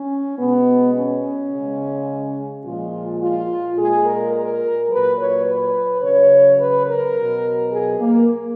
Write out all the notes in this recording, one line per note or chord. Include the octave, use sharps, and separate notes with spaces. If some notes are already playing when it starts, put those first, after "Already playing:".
Already playing: C#4
B2 G#3 B3
C#4
C#3 G#3
A#2 F3 G#3 F4
F4
A#2 G#3 G#4
A#4
A#4
A#2 F#3 B4
C#5
B4
C#3 F#3 C#5
B4
A#4
B2 F#3
G#4
A#3